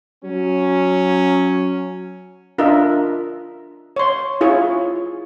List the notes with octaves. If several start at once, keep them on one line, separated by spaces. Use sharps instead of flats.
F#3 C#4
D4 F4 A#4 D#5 E5
C#5 C6
E4 F4 G#4 C#5